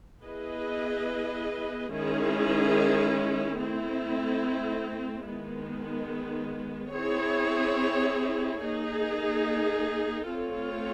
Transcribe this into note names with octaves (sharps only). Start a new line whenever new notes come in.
B3 E4 G#4 B4 D#5
D#3 G#3 C#4 E4 G#4
A3 C4 E4
D#3 G#3 B3
C4 E4 G#4 C#5
A#3 D#4 G#4
A3 C4 F4 A4 C#5